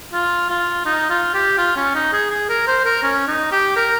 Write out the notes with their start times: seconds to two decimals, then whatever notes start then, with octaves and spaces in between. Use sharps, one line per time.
0.13 F4
0.50 F4
0.86 D#4
1.10 F4
1.34 G4
1.58 F4
1.77 C#4
1.95 D#4
2.13 G#4
2.30 G#4
2.49 A#4
2.67 C5
2.85 A#4
3.03 C#4
3.28 D#4
3.52 G4
3.76 A#4